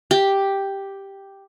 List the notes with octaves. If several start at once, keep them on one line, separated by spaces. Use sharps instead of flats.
G4